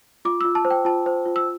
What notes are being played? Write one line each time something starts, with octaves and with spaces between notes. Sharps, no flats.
F4 D6
F4 E6
A5
C5
G5
F4 A5
C5
F4
E6